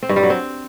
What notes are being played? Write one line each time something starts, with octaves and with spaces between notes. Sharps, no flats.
C4
G2
G3
F#3
C4